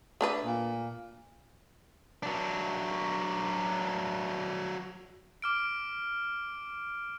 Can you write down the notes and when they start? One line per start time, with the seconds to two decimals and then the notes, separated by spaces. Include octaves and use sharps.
0.21 A3 D4 B4
0.45 A#2
2.23 F#3 D4
5.42 D6 F6 D7